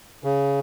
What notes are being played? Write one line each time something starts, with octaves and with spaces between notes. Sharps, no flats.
C#3